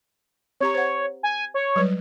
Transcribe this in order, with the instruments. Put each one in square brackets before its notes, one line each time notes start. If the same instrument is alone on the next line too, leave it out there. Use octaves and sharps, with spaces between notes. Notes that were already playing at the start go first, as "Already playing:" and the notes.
[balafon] C4 G4 A#5 [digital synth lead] C#5
[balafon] C5 F#5
[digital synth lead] G#5
C#5
[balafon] F#3 G3 B4